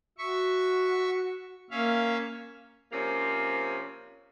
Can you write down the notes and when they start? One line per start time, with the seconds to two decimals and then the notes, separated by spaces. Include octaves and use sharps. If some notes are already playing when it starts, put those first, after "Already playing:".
0.18 F#4 E5 C#6
1.71 A#3 C#4 E5 F5
2.92 C3 F3 A#3 C#4